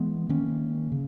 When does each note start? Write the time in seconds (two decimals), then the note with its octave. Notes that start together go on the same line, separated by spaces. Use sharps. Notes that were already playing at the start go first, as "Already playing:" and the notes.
Already playing: E3 G#3 B3
0.29 D#3 A#3 C#4
0.92 C#3